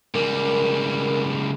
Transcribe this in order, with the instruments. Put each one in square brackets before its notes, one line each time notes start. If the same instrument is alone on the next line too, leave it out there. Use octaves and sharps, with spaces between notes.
[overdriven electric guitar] C#2 G3 [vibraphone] A#4